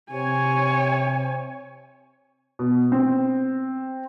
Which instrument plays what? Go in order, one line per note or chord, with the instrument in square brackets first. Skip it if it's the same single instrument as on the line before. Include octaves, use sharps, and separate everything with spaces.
[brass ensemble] C3 [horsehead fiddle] C#5 G#5
[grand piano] B2
C4